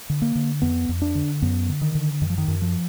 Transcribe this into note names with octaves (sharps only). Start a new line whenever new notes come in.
D3
A#3
D3
F2 B3
F2
D4
D3
F#2 B3
D3
D#3
D3
F#2 D#3
F3
D#3
F#2
F3